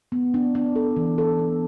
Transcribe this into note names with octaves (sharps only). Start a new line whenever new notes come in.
B3
D4
D4
A4
E3
A4
B3